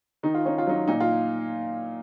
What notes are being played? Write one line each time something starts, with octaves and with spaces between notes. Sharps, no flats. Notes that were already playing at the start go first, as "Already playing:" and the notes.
D#3 D#4
F4
C#4 D#4
F4
F#3 D#4
A#2 D#4
F4